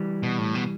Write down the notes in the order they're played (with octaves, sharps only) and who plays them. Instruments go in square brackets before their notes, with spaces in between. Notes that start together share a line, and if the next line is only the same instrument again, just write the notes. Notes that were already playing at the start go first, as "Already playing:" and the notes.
Already playing: [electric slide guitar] E3 G3
[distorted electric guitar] B2
A2
B2